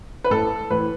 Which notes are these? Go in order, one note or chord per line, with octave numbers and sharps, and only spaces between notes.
B4
A1 A4
A2 E3 B4